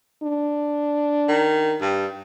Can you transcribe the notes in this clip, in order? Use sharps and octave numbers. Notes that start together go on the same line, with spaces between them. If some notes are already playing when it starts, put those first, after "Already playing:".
D4
D#3
G2